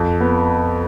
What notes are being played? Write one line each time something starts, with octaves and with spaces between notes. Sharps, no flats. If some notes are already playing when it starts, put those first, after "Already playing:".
Already playing: F2
B3